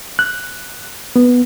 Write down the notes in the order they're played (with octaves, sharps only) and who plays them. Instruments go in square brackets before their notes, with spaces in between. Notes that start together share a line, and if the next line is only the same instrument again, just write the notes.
[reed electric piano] F#6
B3